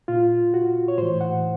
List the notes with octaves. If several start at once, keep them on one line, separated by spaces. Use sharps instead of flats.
A#2 F4
F#4
C#5
A2 E3 C5
F#5